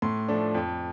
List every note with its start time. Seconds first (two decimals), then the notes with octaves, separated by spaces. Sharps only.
0.02 A2 C6
0.29 F3 A3 D4
0.55 F2